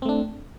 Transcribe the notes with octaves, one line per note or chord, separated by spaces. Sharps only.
A3 C4 D4